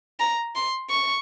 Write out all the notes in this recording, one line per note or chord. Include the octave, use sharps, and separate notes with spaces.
A#5
C6
C#6